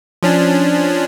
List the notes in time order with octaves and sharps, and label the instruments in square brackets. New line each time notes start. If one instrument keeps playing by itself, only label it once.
[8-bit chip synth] F3 C#4 D4